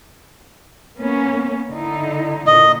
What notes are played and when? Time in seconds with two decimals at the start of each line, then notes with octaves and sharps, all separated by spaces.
0.97 A#3 B3 C#4
1.69 D3 D#4 E4
2.47 A#2 D3 D#5